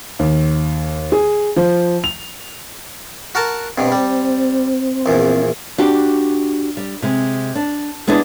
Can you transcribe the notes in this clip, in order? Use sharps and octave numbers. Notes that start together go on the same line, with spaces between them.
D#2
G#4
F3
F7
F#4 A#4 A5
G2 B2 C4
G3
A#1 E2
D4 F#4 G4
G3
C3 G#3
D4
G#3 B3 D4 E4 G#4